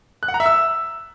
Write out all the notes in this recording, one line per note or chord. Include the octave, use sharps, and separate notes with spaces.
F#6
F#5
A#5
E5
E6